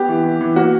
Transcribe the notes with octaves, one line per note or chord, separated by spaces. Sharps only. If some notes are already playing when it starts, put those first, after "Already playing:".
Already playing: B3 G4
E3
E3
E3
A#3 F#4